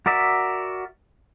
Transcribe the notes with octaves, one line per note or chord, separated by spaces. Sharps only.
F#4 A#4 D5 E5